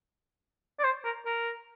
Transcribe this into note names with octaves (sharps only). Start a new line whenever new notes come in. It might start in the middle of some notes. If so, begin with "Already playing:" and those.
D5
C5
A#4
A#4